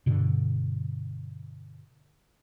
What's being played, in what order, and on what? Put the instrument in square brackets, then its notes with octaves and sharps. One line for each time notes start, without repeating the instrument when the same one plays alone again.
[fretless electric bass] G2 B2 D3